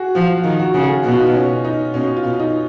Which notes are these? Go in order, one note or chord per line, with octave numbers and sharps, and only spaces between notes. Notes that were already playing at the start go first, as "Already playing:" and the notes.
Already playing: F#4 G#4
F3 F4
F4
D#3
F#4
C#3
G#4
B2 F#4
F4
D#4
F4
C#4
D#4
B2 C#4
F4
B2
D#4